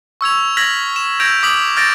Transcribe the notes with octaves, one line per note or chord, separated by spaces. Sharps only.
C#6 E6 G#6 F7
F6 G#6 A#6 B6 F#7
E7
E6 G6 G#6 A#6 D7 F7
D6 D#6 B6 F7 F#7
F6 G6 A6 A#6 D7